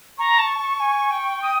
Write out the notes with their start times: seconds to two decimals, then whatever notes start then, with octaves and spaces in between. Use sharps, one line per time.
0.18 A#5 C#6
0.39 A5
0.59 A5
0.80 G#5
1.11 G5
1.42 D#6